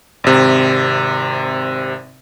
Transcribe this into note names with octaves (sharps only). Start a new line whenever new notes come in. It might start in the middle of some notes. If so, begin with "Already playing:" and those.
G#1 C3